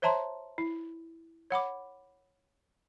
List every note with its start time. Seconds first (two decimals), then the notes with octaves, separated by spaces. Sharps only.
0.02 C5 C#5 E5 A5 A#5 C6
0.58 E4
1.50 C#5 F#5 B5 D6